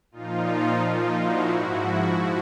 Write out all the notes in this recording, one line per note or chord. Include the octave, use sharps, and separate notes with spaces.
A#2 F3 D#4 F4
D#4 F4
E4 F#4
G#2 F3 E4 F#4